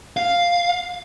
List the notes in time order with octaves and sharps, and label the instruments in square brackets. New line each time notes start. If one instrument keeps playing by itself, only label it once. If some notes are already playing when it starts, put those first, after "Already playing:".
[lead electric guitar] F5